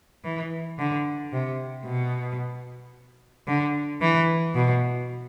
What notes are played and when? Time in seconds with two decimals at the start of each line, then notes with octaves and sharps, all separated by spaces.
0.24 E3
0.79 D3
1.33 C3
1.86 B2
3.48 D3
4.01 E3
4.55 B2